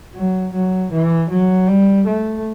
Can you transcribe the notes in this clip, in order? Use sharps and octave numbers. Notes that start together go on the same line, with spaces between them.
F#3
F#3
E3
F#3
G3
A3